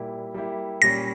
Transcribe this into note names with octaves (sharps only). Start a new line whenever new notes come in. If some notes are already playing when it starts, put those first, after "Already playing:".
Already playing: A#2 G3 A#3 E4 G4
G3 A#3 E4 G4
A#2 G3 C#4 A#6